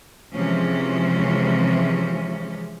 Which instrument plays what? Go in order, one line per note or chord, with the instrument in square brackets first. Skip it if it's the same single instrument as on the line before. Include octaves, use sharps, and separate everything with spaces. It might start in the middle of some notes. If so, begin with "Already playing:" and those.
[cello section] C3 E3 F3 G#3 C#4